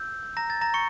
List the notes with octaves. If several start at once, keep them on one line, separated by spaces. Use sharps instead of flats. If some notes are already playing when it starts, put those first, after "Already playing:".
Already playing: E6 G6
A#5 A#6
A6
A#5 A#6
C#6 C#7